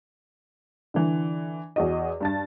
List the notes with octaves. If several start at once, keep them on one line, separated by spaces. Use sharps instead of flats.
D3 E3
E2 F#4 D#5
G2 A5 A6